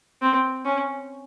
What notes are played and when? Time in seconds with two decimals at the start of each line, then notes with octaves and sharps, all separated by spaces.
0.22 C4
0.65 C#4